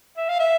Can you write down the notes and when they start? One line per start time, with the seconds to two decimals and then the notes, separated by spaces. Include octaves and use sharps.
0.17 E5
0.29 F5
0.40 E5